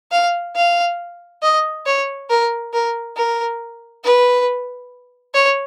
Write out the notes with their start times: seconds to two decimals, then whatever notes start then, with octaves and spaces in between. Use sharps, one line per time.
0.12 F5
0.56 F5
1.42 D#5
1.86 C#5
2.29 A#4
2.73 A#4
3.16 A#4
4.04 B4
5.34 C#5